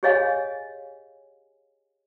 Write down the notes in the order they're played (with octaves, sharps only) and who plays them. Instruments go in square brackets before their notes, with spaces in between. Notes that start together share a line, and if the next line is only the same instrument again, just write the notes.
[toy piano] G4 G#4 C#5 D#5 F5 G#5